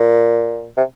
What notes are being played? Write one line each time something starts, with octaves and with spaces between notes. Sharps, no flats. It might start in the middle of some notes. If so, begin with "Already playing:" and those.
Already playing: A#2
C3